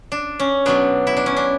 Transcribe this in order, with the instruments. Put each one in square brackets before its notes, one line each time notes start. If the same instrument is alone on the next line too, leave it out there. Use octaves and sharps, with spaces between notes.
[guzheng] D4
C#4
B2 F#3 B3 D4
E4
D4
C#4
D4